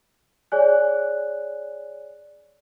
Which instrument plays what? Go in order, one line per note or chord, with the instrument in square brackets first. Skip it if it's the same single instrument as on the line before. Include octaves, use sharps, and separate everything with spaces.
[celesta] G#4 C#5 D5 G#5 F#6